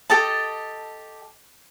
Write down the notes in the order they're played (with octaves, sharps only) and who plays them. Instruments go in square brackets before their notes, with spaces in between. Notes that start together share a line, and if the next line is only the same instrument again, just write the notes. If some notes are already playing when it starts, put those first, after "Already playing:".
[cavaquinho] G4 A4 D#5 A5